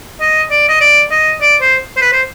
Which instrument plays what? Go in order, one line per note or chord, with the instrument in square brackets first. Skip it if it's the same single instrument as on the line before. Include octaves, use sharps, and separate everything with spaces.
[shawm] D#5
D5
D#5
D5
D#5
D5
C5
C5
B4
C5